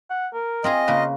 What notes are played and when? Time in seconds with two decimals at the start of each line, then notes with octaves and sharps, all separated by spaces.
0.10 F#5
0.34 A#4
0.64 C4 F4 G#4 D#5
0.88 C#3 A#3 F4 B4